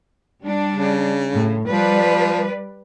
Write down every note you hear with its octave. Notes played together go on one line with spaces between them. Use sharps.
G3 D4
C#3
A2
F3 G3 B4 D5